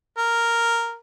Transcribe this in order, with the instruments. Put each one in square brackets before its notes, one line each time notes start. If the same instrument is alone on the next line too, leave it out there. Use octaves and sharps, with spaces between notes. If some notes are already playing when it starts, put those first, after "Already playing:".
[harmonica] A#4